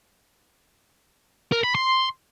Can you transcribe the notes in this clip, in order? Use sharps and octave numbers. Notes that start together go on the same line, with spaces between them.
A#4
B5
C6